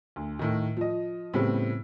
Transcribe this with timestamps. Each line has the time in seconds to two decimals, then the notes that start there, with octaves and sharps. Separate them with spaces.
0.16 D2
0.39 A2 D#3
0.77 F3 D#5
1.34 A2 C#3 G3 B3 C4